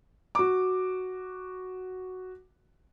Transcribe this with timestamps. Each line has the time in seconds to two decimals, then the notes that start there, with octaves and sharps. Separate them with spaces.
0.35 F#4 D6